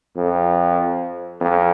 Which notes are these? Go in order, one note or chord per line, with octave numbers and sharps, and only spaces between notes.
F2
F2